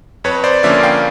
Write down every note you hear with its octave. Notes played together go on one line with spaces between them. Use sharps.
F2 B4 C#5
C5 D5
D3 F3 A#3 C#4 D5 E5
F5 G5